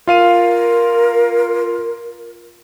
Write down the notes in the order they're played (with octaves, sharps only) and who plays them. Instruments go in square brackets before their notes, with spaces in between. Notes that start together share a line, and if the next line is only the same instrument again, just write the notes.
[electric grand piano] F4 F5 D#7 [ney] A#4